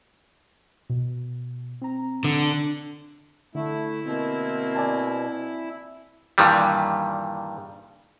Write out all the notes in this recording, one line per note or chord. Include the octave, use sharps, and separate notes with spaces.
B2
C4 A#5
D3
D3 A3 E4
B2 A#3 C4
D5 G#5 A5
G2 A#2 D#3 E3 G3